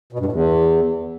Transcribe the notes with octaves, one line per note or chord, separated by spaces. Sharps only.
B2
G2
A2
E2